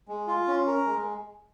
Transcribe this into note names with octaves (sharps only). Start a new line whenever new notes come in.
G#3
F4
C#4
A#4
G#3